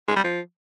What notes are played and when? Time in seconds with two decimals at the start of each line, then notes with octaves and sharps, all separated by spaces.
0.08 G#3
0.16 G3
0.24 F3